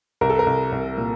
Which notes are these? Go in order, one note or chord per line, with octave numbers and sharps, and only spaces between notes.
C2 A#4
A4
A#4
C2
C2
A#2